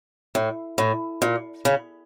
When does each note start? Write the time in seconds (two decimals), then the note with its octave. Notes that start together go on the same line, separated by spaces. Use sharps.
0.35 A2
0.78 A2
1.22 A#2
1.65 C#3